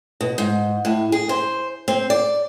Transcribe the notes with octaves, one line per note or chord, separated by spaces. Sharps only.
B2
G#2
A2
G#4
C5
C4
D5